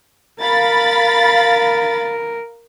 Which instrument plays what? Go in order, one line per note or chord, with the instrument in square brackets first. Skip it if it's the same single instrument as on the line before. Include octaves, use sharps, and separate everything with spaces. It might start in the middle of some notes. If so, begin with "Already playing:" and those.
[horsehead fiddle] A#4 [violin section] F5 B5 A6